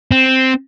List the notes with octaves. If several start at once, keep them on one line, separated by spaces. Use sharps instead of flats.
C4